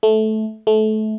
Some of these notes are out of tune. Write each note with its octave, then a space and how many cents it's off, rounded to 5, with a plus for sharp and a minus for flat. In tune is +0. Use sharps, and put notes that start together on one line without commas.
A3 -15
A3 -25